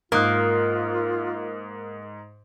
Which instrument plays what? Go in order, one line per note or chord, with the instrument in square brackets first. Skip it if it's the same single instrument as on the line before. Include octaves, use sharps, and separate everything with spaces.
[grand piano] G#2 [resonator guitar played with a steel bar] A#3 [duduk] F4 [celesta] A#4 D#6 F#6